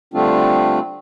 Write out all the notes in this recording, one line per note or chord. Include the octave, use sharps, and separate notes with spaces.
D3 G3 A3 C4 D4 F4